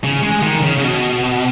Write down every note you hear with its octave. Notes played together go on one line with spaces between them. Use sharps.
C#3
G#3
D#3
C#3
C#3
B2